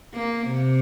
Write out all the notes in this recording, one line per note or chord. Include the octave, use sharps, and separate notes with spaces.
A#3
C3